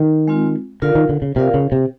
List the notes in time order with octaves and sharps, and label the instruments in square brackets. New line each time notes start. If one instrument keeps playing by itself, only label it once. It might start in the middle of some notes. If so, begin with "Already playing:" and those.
Already playing: [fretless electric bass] D#3
[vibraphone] G#3 C4 F4
[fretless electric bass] D3 [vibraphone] F4 A#4 D5 F5
[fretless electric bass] D#3
D3
C#3
[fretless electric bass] C3 [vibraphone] F4 A#4 D5 F5
[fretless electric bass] C#3
C3